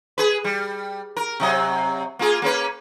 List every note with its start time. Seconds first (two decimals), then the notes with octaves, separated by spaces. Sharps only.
0.18 G#4 B4
0.44 G3
1.17 A#4
1.40 C3 F#3 D#5
2.19 A#3 F4 G#4
2.42 A#3 C#4 B4